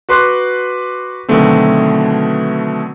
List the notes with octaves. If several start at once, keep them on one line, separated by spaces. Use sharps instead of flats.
F#4 B4 C6 D6 F#6
B2 D3 D#3 F#3 A3 C4